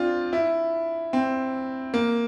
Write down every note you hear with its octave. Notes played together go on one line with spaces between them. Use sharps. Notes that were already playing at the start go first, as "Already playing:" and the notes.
Already playing: C4 D4 F4
E4
C4
A#3